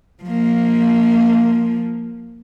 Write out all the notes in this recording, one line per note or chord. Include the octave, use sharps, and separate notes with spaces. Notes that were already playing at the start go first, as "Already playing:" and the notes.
F3 A#3